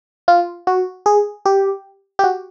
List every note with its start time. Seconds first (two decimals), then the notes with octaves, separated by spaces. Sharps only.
0.28 F4
0.67 F#4
1.06 G#4
1.46 G4
2.19 G4
2.24 F#4